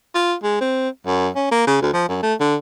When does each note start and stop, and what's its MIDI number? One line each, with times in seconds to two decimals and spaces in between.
0.15 0.35 65
0.43 0.59 56
0.61 0.89 60
1.06 1.29 42
1.36 1.49 61
1.52 1.67 58
1.67 1.78 49
1.82 1.92 38
1.93 2.05 53
2.08 2.21 42
2.23 2.34 57
2.40 2.56 50